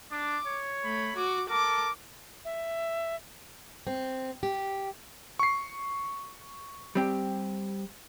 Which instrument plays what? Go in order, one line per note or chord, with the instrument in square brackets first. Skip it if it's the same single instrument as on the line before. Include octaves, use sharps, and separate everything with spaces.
[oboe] D4 [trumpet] D6
[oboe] C#5
[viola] A3 [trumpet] B5
[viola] F#4 [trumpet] D6
[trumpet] A4 [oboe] A#4 [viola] D6
[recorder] E5
[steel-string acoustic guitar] C4
G4
[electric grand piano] C#6 C7
[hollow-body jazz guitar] G3 C4 G4